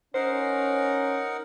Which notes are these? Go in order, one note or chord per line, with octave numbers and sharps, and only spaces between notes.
C#4 D#4 A#4 C5 F#5